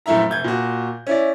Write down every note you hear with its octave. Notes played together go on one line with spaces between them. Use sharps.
A#1 F#2 A3 E4 E5 A#5
F1 G6 G#6
A#2 F#4
C#4 E4 D5